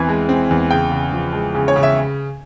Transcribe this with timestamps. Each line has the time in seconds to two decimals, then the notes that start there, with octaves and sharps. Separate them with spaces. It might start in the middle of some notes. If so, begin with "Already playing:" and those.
Already playing: E2 E3 C4 G#5
0.09 G#3
0.29 C4
0.50 E2
0.71 C#3 G5
0.91 C#3
1.13 F3
1.33 G#3
1.54 C#3
1.68 C#5
1.76 C#3
1.83 E5